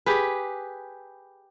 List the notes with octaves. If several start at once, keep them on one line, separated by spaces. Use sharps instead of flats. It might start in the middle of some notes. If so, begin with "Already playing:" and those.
G4 G#4 B4